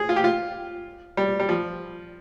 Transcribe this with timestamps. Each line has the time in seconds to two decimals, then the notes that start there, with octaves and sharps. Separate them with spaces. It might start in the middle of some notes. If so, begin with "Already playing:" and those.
Already playing: G#4
0.09 F4
0.16 G4
0.24 F4
1.17 G3
1.40 G3
1.49 F3